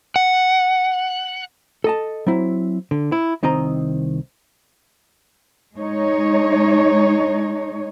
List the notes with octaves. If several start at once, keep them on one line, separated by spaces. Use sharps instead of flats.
F#5
A4 D#5 A5
F#3 C4 E4
D3
E4
C2 D#3 C4 D#5 A#5
G#3 D#4 C#5